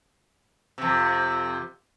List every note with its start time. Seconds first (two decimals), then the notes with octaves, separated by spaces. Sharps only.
0.78 F2 C3